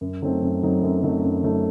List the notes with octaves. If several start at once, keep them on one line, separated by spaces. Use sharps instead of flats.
F#2
F#3 A3 C4 D#4
F#2
F#3 A3 C4 D#4
F#2
F#3 A3 C4 D#4
F#2
F#3 A3 C4 D#4